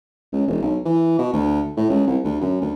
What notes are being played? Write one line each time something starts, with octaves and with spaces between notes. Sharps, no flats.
C#2
E1
B1
E3
B2
D2
A2
C#2
C2
D2
F#2
D2